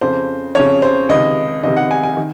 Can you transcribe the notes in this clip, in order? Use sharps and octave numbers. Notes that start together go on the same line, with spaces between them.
F2 C#3 C5
F2 C#3 C#5
C5
C#2 C3 D#3 D#5
C#2 C3 D#3 D#5
F#5
G#5
G#5
D#3